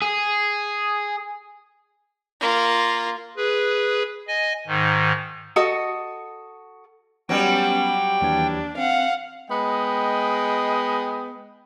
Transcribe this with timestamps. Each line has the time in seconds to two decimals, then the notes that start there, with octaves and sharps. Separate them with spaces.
0.02 G#4
2.41 A#3 F4
3.37 G#4 B4
4.28 D#5 G#5
4.67 G#2 D#3
5.56 F#4 A4 D#5 D#6
7.29 F#3 G3 B3 C#4 G5
8.22 D#2 E3 D4 G#6
8.78 C4 F5 F#5
9.51 G#3 B3 D#5 G5